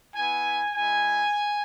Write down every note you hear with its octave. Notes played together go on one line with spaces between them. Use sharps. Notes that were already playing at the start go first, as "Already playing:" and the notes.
B3 E4 G#5
G#3 E4 G#5